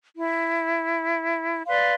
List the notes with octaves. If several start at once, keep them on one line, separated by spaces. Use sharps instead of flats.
E4
B4 D5 F5 C6